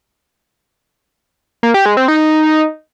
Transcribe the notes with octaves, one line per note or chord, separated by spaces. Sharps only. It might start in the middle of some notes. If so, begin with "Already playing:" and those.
A#3
G4
G#3
C4
D#4